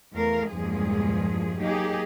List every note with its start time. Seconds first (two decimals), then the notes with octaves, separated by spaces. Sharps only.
0.13 E2 A3 A#4 F5
0.49 E2 G2 A#2 F3 G#3 G#4
1.60 F#3 A#3 D#4 G4 G#4